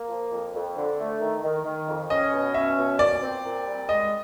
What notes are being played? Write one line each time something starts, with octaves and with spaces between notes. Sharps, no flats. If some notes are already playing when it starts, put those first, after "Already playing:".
Already playing: A#3
F3
F2
F2
D3
A3
D#3
D#3
D#3
F2
C#4 D#5
B2
C#4 E5
B2
A#2 D5
C4
A#2
G3
G#3 D#5